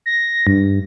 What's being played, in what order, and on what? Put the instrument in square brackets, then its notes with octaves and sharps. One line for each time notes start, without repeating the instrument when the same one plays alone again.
[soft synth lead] A#6
G2